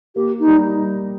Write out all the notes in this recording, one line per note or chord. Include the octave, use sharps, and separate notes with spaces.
A#3 G4
D#4
G3